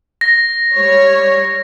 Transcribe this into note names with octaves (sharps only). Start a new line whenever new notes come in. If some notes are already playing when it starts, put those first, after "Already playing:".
A#6
G3 C#5